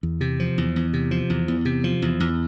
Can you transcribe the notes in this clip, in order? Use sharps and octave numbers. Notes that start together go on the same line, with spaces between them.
E2
C3
F3
E2
E2
C3
F3
E2
E2
C3
F3
E2
E2